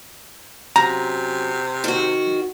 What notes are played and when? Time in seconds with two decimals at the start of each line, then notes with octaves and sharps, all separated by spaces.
0.76 F#2 C3 A#5
1.84 D#3 F#4